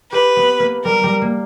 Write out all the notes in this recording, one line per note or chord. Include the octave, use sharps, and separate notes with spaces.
G4 B4
B3
A#3
G3 A#4
G3
A#3